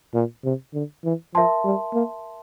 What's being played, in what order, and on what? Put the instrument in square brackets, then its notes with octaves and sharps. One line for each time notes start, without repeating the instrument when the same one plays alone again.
[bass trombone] A#2
C3
D3
E3
[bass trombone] F3 [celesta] A#4 E5 A5 C6
[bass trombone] G3
A#3